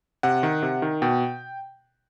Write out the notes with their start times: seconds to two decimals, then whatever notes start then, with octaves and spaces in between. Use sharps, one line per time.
0.23 C3 F#5
0.43 D#3
0.62 C3
0.82 D#3
1.02 B2 G5